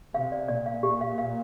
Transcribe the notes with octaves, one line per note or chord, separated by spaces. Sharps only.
C3 F5
D5
A#2 D5
F5
G4
F5
F5